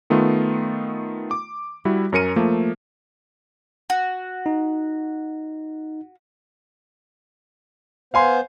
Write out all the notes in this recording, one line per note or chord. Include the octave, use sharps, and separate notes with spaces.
D#3 A3 B3 F4
D6
G3 E4 F#4
F#2 C#4 A#4 C#7 D#7
F3 A3 A#3
F#4
D#4
B3 C5 F5 G#5 C6